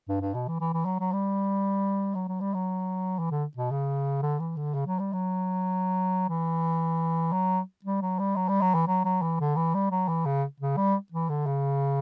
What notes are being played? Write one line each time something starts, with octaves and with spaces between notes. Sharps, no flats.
G2
G2
B2
E3
E3
E3
F#3
F#3
G3
F#3
F#3
G3
F#3
E3
D3
B2
C#3
D3
E3
D3
C#3
F#3
G3
F#3
E3
F#3
G3
F#3
G3
F#3
G3
F#3
E3
F#3
F#3
E3
D3
E3
G3
F#3
E3
C#3
C#3
G3
E3
D3
C#3